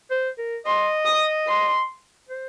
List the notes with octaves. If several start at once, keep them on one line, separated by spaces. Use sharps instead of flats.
C5
A#4
D#5 C6
D#6
C6
C5